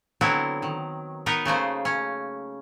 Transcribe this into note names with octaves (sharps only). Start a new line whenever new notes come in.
D3 F#3 B3 C4 E4
D#3
B3 D#4 A#4 B4
C#3 A3 A#3 C5
C#4